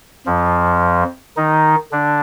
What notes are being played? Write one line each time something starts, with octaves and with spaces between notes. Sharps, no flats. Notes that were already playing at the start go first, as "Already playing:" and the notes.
F2 F3
D#3 D#4
D3 D4